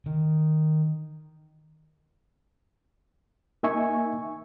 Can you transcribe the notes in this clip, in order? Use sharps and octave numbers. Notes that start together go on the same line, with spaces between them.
D#3
A#3 D#4 E5 G#5 C#6